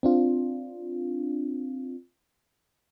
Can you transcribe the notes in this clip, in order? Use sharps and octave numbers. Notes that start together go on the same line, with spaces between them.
C4 D4 F4